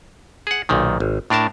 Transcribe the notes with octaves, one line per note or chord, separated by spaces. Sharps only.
G#4 F#5
B1 A#2 D#3
G#1
A2 D4 A#4 A5